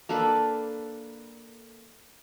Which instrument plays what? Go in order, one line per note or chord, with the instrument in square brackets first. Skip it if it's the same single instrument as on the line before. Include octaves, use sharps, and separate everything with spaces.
[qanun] A#3 D4 A4 B4